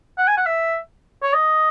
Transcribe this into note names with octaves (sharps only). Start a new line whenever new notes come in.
F#5
G#5
F#5
E5
C#5
D#5